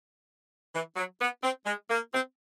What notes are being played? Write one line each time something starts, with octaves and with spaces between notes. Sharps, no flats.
E3
F#3
B3
C4
G#3
A#3
C4